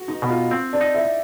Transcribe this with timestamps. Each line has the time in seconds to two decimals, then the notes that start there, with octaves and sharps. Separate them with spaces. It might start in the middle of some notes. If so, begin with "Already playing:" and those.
Already playing: F#4
0.08 D#4
0.22 B2
0.29 F4
0.51 C4
0.73 D4
0.81 D#4
0.94 E4